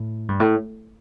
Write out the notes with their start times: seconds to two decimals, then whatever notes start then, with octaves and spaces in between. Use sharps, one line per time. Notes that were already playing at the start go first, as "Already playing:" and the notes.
Already playing: A2
0.29 G2
0.40 A2